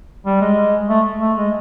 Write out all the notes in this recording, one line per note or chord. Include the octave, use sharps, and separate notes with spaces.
G3
G#3
A3
A3
G#3